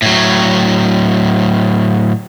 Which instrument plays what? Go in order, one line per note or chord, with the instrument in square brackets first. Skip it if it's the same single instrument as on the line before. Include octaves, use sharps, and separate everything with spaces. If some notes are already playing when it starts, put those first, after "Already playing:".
[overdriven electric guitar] A2 F#3